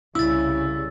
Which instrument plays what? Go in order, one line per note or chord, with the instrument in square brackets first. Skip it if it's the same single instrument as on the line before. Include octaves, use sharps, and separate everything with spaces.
[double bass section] C2 C#3 G3 [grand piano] E4 [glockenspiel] E6 A6